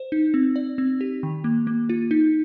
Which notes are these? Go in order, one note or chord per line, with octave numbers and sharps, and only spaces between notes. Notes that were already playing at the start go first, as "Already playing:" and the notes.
Already playing: C5
D#4
C4
D5
C4
G4
D#3
A#3
A#3
F4
D#4